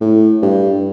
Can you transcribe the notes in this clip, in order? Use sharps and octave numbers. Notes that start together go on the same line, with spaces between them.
A2
G2